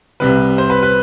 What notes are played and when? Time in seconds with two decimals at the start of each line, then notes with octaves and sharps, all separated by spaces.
0.20 C2 C3 G3 B4
0.58 C5
0.70 B4
0.83 B4